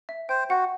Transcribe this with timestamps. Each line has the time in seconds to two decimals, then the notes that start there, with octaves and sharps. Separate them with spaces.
0.09 E5
0.29 C5 G5
0.50 F#4 F#5